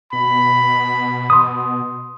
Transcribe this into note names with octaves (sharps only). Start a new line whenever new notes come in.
B2 B5
C6 D#6